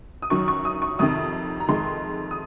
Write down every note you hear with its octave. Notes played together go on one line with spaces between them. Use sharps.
D#6
F#2 D#3 F#3 C#6
C#6
D#6
C#6
F2 C3 D#3 D#6
A#5
F2 D#3 G#3 C6
D#6